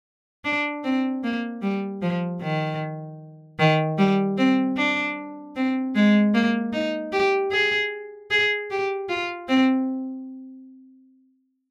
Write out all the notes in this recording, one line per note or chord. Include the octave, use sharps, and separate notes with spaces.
D4
C4
A#3
G3
F3
D#3
D#3
G3
C4
D4
C4
G#3
A#3
D#4
G4
G#4
G#4
G4
F4
C4